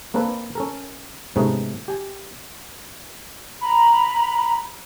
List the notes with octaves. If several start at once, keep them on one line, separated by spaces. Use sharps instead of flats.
A#3 C4 D4 A4 B4
C#4 A4 A#4
G#2 C3 A3 B3 C#4 D#4
G4 G#5
A#5 B5